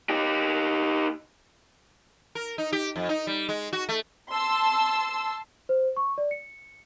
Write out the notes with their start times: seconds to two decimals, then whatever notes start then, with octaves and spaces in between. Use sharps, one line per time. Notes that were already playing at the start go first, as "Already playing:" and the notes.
0.10 D#4 G4
2.35 A#4
2.58 D#4
2.72 G4
2.96 F2
3.09 D#4
3.27 G3
3.49 G#3
3.73 F#4
3.89 A3
4.32 A5 C6 E6
5.69 C5
5.97 C#6
6.18 D5
6.31 C#7